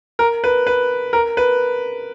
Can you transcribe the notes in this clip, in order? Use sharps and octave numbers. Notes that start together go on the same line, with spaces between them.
A#4
B4
B4
A#4
B4